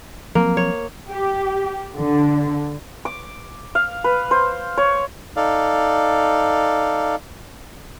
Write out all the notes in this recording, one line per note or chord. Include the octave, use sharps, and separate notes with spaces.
F3 F#3 A#3 C4
C#5
G4
D3
D6
F5
B4
C5
C#5
D#4 A4 D5 F5